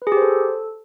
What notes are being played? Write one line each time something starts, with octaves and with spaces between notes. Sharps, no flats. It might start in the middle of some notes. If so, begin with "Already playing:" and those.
B4
G#4
G4
C5
A4